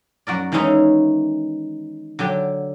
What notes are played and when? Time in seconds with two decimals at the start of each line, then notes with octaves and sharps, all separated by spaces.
0.27 F#2 F#4 A#4 D5
0.52 D#3 E3 G#3 C#4 D#4 E4
2.19 D3 F#3 G4